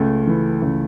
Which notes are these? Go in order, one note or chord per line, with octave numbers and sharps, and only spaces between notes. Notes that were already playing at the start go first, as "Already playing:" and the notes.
Already playing: C#2 A3
E3
C#2